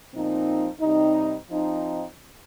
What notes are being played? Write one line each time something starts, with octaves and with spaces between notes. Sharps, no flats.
A#2 F3 C4 D#4
C3 G3 C4 D#4
F3 C4 D#4